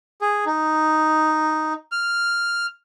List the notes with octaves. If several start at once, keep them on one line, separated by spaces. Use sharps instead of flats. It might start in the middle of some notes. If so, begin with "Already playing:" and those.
G#4
D#4
F6